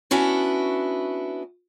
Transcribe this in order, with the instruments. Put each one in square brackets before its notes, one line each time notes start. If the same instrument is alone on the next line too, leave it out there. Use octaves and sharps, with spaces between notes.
[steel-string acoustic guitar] B3 C#4 D4 E4 F#4